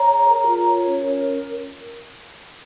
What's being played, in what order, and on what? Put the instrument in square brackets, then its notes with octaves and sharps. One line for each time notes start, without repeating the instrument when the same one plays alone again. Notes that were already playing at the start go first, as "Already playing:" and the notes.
Already playing: [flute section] C#5 A#5
G#4
A#4
F4
C#5
C#4
A#4